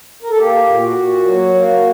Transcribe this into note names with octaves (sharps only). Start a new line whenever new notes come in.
A#4
A4
A#3 G4
A#2
F#4
A#2
F#3
A#3